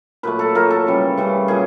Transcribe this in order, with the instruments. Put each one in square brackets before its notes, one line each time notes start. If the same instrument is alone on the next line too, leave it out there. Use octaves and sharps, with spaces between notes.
[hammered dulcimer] A#2 F#3 A3 B4
A4
A#2 F#3 A3 A#4
A4
C#3 E3 G3
C#3 E3 G3
A#2 F#3 G#4